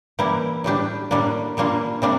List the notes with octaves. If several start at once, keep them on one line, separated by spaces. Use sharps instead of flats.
E3 G3 A#3 E4 G4
A2 G3 D4 G4
A2 G3 A#3 D4
A#2 G3 A#3 D4 F4
C3 G3 A#3 D4